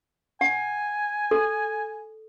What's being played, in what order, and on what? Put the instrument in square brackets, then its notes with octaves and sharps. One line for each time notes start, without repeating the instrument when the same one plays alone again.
[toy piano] F#5 [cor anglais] G#5
[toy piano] A4